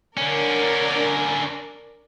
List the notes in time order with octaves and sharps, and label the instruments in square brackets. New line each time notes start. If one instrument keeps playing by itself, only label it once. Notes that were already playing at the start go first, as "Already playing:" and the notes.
[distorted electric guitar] D3 C#4 [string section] D4 A#4 D5